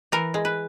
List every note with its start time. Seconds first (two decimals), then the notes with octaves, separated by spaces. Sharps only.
0.12 E3 A#4
0.34 G#3
0.45 B4